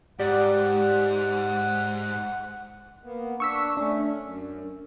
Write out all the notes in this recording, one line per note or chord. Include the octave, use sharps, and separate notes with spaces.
G#2 G4 D5 F#5
A#3 B3
D4 C#6 E6 B6
A3 C#4 D4
F#2